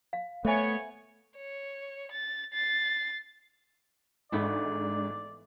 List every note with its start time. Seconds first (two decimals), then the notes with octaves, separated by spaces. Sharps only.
0.13 F5
0.45 A3 B3 C5 C#5 E5 G#5
1.36 C#5
2.11 A6
2.53 A6 C7
4.32 G#1 G#2 E3 G#3 A3 B3 D4 D5